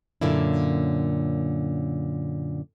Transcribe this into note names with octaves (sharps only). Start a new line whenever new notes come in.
F#2 A#2 D3 A#3 C#4 E4